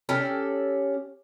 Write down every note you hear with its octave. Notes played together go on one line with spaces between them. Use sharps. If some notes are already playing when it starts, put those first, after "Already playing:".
C#4 G4 A4 D5